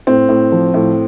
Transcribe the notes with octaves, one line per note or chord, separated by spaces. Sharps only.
A2 C4
A2
F3
A2